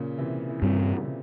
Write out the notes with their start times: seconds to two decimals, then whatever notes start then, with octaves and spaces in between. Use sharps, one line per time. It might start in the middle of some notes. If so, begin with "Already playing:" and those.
Already playing: A#2 C#3
0.18 C3 E3
0.49 E3
0.61 G2 A#2 C#3 G3 C4
0.96 C#3
1.05 C3